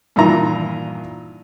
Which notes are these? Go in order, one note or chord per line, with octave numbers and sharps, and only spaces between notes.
G2 A#2 D#3 E3 E5 A#5